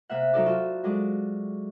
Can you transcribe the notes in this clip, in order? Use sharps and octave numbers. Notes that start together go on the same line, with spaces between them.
C3 A#3 E5 F#5
F#3 D#4 A4 D5
D#4 F4 F#4 A4
F#3 G#3 G#4 A4 D5